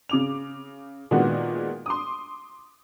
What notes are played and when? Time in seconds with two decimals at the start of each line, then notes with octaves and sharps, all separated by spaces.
0.09 C#3 D6 F7
1.11 A#2 D#3 G#3 B3 F#4
1.86 C6 D6 D#6